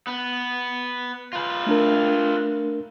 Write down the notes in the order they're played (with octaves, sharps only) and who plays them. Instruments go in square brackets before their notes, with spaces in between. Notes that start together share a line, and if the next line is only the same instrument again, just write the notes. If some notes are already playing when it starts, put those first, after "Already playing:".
[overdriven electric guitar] B3
F4 B4
[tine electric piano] A3 D4 A#4